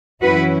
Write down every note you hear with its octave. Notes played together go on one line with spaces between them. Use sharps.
F#2 E3 C#4 E4 F#4 B4